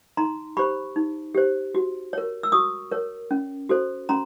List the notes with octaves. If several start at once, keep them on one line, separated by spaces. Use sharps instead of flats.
D#4 A#5 C6
G4 C5 B5 C#6
D#4
G4 C5
F#4
A#4 C#5
E6
F#4 C#6 D#6
A#4 C#5
C#4
F#4 A4 C5
C#4 A#5 C6